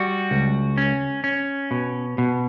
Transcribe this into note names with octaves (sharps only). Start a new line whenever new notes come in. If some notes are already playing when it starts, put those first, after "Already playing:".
Already playing: G3 F#4
C#2
C#4
C#4
B2
B2